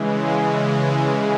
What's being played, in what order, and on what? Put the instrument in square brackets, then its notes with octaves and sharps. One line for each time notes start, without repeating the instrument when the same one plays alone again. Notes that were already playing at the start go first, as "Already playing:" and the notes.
Already playing: [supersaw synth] C#3 E3 G#3